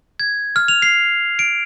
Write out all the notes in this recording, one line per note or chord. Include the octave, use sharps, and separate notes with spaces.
G#6
F6
F7
C7
D7